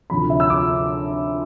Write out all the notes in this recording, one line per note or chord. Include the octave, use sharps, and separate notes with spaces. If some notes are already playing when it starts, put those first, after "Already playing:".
D2 C3 F3 B5
E5
E6
D6